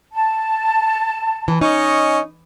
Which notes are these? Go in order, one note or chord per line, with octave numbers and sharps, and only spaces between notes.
A5
E3
C#4 D#4 D#5 C#6